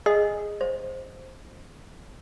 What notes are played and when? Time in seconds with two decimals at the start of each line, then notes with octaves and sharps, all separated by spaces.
0.06 G#4 D#5
0.61 C5